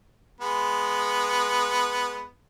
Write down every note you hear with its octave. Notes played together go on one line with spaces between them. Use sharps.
G#3 B3